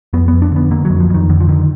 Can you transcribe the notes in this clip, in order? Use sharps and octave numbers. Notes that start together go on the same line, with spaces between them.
F2 B3
F2 B3
D4
D3 B3
D3 A#3
F2 F#3
F3
F2 D#3
F2 D3
F3
D3 D#3